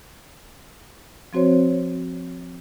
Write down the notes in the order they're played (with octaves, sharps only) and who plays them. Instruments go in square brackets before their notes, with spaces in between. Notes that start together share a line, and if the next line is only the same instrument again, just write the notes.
[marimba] F3 C4 F#4 C5 C#5